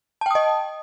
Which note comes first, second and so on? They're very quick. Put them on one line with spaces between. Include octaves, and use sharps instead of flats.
A5 G5 D#6 D#5